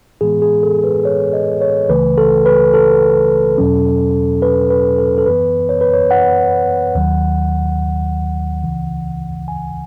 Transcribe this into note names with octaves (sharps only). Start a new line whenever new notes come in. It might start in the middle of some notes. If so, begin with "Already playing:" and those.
A2 E3 G#3 B3 G#4
G#4
A4
B4
C#5
D#5
C#5
C#2 C#3 E3 A3 B4
A4
B4
A4
E2 B2 F#3 C#4
B4
B4
A4
A4
F#2 E3 B3 B4
C#5
B4
C#5
F#5
D#2 D#3 F#3
C#2 C#3 E3
G#5